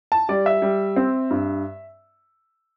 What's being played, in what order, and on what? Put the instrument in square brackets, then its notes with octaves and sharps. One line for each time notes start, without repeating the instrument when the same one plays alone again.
[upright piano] A5
G3 D5
E5
G3
C4
G2